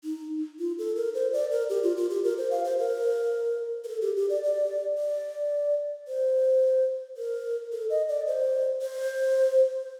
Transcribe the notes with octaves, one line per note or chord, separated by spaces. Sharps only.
D#4
F4
A4
A#4
C5
D5
A#4
G4
F4
F4
G4
A#4
C5
F5
C5
A#4
A#4
A4
G4
G4
D5
D5
D5
C5
A#4
A4
D#5
D5
C5
C5